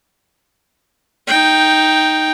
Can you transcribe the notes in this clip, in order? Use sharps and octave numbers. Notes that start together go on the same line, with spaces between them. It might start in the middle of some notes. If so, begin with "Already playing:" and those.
D#4 G5